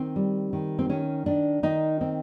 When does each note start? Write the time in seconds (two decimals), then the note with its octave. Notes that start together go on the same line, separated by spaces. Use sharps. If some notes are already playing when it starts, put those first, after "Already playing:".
Already playing: D#3 C4
0.16 G3
0.53 D#3
0.79 C4
0.90 D#3 C#4
1.26 D#3 D4
1.63 D#3 D#4
2.01 C4